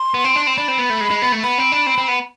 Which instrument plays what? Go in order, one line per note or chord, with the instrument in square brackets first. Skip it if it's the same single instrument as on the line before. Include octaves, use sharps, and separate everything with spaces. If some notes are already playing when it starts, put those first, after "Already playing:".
Already playing: [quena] C6
[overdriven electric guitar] B3
C4
D4
[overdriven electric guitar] C4 [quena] C6
[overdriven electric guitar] D4 [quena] B5
[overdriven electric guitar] C4
B3
A3
G#3
G#3
B3
A3
[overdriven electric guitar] B3 [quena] B5
[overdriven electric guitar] C4
D4
C4
C4
B3